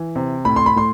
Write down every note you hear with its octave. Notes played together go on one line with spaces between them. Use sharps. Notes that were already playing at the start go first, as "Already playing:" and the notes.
Already playing: E3
C3
A2 B5
C6
B5
A2 C6